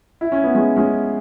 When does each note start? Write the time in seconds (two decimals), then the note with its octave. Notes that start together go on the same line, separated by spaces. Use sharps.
0.21 E4
0.32 C#4
0.44 B3
0.55 G#3 C#4
0.76 G#3 C#4